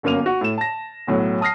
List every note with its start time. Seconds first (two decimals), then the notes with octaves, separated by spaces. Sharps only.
0.03 G1 F#2 A#3 D#7 F7
0.26 F#4
0.41 A2 E7
0.58 A5 A#6
1.07 B1 A2 F#3
1.41 A5 D#6 F6 A#6 C7